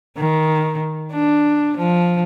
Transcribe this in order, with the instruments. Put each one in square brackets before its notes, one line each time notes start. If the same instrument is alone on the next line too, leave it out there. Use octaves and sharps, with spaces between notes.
[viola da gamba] D#3
D4
F3